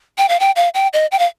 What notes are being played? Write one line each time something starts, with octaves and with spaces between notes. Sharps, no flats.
G5
F5
G5
F5
G5
D#5
G5
F5